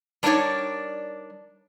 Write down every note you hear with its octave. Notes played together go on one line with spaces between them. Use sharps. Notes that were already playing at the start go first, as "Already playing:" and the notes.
G3 D4 D#4 A#4 C#5 D5